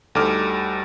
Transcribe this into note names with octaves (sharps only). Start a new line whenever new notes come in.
D2 G3 D#4 A4 D6 F6